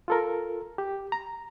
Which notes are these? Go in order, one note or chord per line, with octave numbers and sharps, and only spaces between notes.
F4 A4 A#4
G4
A#5